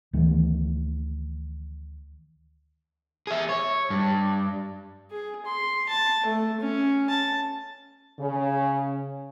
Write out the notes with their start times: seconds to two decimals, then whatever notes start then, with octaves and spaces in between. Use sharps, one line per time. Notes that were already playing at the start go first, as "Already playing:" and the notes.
0.13 D2 D#3 E3
3.27 G#4 E5
3.49 C#5
3.90 G2
5.11 G#4
5.46 C6
5.89 A5
6.26 A3
6.61 C#4
7.10 A5
8.19 C#3